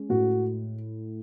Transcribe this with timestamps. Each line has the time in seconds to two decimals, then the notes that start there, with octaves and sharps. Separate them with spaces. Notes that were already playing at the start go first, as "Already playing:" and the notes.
Already playing: G#3 C#4
0.09 A2 F#4